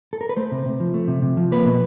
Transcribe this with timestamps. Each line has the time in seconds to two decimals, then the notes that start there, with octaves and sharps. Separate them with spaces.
0.13 A4
0.21 A#4
0.29 B4
0.37 A3 C5
0.52 C3
0.66 C3
0.80 F3
0.94 A3
1.08 C3
1.22 C3
1.37 F3
1.52 A#3 B4
1.66 B2